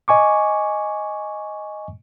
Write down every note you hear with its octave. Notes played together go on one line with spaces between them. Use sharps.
D#5 G#5 C#6 D6